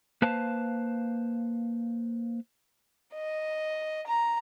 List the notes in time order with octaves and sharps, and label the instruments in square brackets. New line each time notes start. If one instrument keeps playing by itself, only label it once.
[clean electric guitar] A#3 B4 C5 F5 A5
[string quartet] D#5
A#5